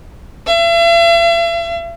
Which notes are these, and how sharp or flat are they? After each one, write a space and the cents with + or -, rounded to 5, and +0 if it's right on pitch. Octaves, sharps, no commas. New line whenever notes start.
E5 +45